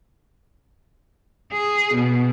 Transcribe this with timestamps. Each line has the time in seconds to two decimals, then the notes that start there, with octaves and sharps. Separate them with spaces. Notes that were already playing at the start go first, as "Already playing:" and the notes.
1.53 G#4
1.94 B2